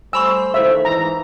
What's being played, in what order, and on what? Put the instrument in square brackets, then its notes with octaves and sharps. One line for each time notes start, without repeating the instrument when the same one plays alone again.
[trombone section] G3 A3 C5 [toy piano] G#5 B5 C#6 [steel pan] E6
[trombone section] D#3 A3 [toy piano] E4 C5 F5 [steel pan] E5
[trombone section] G#2 E3 [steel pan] A#5